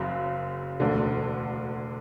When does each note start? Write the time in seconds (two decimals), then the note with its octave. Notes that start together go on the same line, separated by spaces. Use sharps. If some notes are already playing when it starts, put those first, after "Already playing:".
Already playing: F#1 F#2 C#3 F#3
0.80 E1 D2 D3